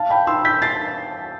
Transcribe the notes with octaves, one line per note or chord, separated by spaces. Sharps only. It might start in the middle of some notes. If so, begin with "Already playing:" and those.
Already playing: F5 A5
G5 B5
C6 E6
G6 B6
A6 C7